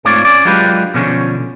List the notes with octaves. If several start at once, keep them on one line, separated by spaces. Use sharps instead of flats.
G#2 A3 C4 F4 C#5 D5
C#4 D5
F#3 G#3 D4 F4 G4 B4
B2 D3 F3 C#4